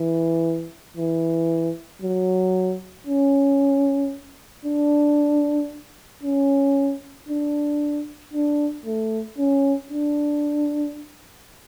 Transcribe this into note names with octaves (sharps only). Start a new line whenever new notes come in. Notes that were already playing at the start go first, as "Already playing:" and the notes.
Already playing: E3
E3
F#3
C#4
D4
C#4
D4
D4
A3
C#4
D4